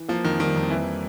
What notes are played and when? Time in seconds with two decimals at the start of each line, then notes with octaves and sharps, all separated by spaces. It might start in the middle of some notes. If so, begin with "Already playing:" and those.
Already playing: E3
0.08 F3 A#3
0.24 F2 D#3
0.40 D#3 G3
0.56 F2
0.70 E3 A#3
0.87 G3